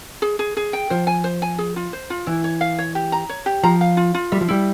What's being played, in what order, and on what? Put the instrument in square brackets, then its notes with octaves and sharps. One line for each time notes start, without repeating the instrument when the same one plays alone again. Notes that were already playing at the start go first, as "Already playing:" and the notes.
[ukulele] G#4
G#4
G#4
G5
[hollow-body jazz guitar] F3 [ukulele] C5
[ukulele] G#5
C5
G#5
G#4
F4
C5
F4
[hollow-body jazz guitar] E3 [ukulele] E4
[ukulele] C#5
F5
C#5
G4
A#5
C#5
G4
[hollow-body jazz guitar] F3 [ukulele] A#5
[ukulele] F5
F4
F4
[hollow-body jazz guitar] G3 [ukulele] E5
[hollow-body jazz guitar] F3
[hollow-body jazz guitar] G3 [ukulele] E4